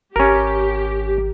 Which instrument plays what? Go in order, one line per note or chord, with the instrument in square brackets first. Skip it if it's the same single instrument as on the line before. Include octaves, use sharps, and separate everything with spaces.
[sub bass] G#1 [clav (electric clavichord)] C#4 A#4 [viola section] G4